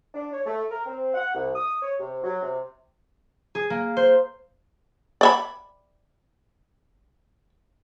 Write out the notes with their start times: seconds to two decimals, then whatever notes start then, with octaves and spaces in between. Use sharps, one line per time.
0.14 D4
0.33 C#5
0.46 A3
0.70 A#4
0.86 C4
1.14 F#5
1.35 C2
1.55 D#6
1.82 C#5
2.00 C3
2.24 F#3
2.43 C3
3.55 G#4
3.70 A#3
3.97 C5
5.21 D5 E5 B5